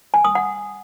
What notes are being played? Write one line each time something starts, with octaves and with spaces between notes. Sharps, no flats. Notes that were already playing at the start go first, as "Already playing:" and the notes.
G#5
D#6
F#5